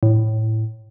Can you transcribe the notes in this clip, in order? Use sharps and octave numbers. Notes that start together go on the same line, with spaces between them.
A2